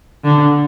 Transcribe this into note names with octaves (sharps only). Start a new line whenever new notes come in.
D3